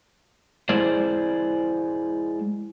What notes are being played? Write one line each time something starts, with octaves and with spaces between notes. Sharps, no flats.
G#3 E4 C5 D5